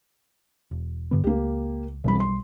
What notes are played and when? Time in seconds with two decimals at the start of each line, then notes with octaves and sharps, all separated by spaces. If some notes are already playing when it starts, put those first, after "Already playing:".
0.71 E1
1.11 G2 D3 B3
1.24 C#2 A#3 G4
2.04 E1 B1 F2 F3 G3 B5
2.20 C6